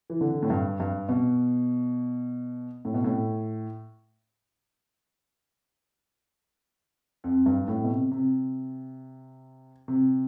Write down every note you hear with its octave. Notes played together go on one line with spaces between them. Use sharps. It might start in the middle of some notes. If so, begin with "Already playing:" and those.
E3
D3
A2
G2
G2
B2
A2
B2
A2
F2
G2
A2
B2
C3
C3
C3